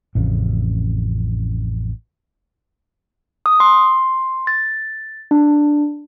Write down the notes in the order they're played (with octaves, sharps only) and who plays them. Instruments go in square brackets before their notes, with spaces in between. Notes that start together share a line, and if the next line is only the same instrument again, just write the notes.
[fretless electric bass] A1 F2 C#3
[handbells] D#6
C6
A6
D4